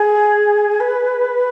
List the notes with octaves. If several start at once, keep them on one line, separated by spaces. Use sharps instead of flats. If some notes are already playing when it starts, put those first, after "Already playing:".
Already playing: G#4
B4